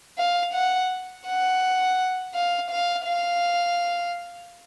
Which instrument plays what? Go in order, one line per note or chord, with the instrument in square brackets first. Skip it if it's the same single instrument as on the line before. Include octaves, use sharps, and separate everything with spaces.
[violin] F5
F#5
F#5
F5
F5
F5